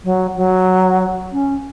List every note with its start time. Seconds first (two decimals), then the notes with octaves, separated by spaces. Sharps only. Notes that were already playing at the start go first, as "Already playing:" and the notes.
0.04 F#3
0.36 F#3
1.33 C#4